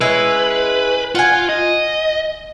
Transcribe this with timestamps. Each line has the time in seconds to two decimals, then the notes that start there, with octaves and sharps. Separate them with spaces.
0.01 G#3 C#4 E4 B4
1.15 F4 F#5 G#5
1.49 D#5